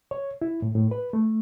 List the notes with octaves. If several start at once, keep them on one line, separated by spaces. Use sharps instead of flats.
C#5
E4
A2
A2
B4
A3